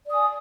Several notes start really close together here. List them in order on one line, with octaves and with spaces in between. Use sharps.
D5 D#6 G#5